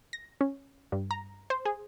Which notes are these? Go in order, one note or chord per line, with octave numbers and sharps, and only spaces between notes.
A#6
C#4
G2
A#5
C5
G#4